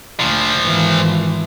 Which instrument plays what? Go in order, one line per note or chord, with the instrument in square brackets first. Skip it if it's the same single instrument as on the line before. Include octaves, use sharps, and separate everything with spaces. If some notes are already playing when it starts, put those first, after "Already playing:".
[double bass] D2 [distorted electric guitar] A#2 F3
[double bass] G#1 E3